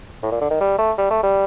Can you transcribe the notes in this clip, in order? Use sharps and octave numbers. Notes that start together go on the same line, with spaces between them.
A2
A#2
D3
D#3
G3
A3
G3
A3
G3